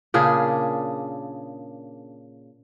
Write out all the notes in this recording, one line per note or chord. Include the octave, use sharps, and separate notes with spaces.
A#2 C#3 D4 G#4